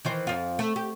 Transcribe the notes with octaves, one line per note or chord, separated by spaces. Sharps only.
D#3 E3 C5
F2 F4
A3
G4